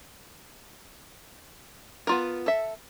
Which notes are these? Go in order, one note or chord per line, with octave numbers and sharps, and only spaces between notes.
B3 F4 A#4
A4 E5